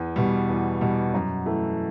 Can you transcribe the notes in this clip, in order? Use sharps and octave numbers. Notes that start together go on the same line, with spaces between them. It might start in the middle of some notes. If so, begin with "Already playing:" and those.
Already playing: E2
B2 G3
E2
B2 G3
F#2
E3 A3